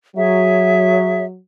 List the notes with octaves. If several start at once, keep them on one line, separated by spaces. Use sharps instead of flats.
F#3 G#4 C#5 E5